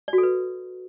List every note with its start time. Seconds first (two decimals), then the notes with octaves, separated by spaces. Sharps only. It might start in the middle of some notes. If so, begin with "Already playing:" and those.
0.08 D5
0.13 F#4
0.18 A4
0.23 B4